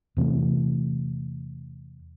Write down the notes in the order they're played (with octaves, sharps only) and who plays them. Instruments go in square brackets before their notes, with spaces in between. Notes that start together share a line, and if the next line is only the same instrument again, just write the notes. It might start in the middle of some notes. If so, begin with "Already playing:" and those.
[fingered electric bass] E2 C3 E3 A3